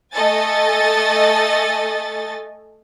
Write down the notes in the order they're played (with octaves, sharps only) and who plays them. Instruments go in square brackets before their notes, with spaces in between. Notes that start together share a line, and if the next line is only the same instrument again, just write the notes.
[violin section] A3 A4 D#5 G#5 A6